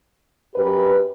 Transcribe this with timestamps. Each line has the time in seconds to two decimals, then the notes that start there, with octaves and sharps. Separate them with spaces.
0.56 F#2 G4 B4